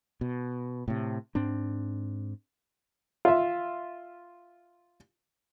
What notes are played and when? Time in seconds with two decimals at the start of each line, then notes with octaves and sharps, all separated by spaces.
0.21 B2
0.88 A2 C3
1.35 G#2 C4 D4
3.25 F4 E5